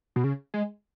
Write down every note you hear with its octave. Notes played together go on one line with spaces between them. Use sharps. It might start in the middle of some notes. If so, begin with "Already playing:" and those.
B2
C#3
G#3